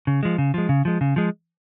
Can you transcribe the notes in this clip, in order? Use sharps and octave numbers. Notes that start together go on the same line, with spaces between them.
C#3
F3 G#3
C#3
F3 G#3
C#3
F3 G#3
C#3
F3 G#3